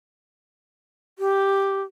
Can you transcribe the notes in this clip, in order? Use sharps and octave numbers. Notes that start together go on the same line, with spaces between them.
G4